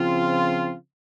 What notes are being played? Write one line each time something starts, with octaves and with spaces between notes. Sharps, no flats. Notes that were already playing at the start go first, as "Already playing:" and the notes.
Already playing: C#3 F3 C4 F4